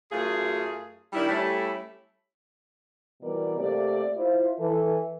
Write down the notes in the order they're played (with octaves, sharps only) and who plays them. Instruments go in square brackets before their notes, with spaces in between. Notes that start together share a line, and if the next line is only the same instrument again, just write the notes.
[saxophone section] F#2 A3 F4 G#4
D#3 G3 D4 E4
G3 A3 C#4 E4 G4 A4
[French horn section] B2 E3 G3 B3 A#4 D5
C3 A3 A#3 G4 D5
E4 F4 C5
E3 A4